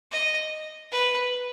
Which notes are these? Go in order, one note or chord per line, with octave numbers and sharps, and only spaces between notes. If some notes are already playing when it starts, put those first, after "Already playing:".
D#5
B4